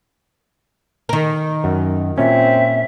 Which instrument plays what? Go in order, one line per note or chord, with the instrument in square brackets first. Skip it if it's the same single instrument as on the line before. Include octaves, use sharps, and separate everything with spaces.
[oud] D#3 A#4
[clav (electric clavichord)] F#2
[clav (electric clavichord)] A#2 C#4 [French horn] C4 [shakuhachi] E5